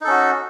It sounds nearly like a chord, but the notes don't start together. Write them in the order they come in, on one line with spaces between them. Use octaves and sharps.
D#4 A4 C#4 F#4